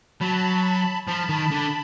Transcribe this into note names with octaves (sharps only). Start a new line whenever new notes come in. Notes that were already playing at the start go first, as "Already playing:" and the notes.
F#3 A5 B5
F3 A5 B5
D#3
D3